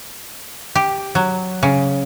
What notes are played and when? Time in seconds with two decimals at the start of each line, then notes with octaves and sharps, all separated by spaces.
0.75 G4
1.15 F#3
1.63 C#3